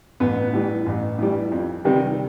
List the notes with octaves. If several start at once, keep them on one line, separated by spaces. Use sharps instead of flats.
A1 B3
A2 E3 G3
A1
A2 E3 G3
F2
C3 D#3 G3